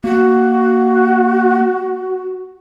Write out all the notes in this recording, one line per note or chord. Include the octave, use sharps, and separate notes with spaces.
A#3 F#4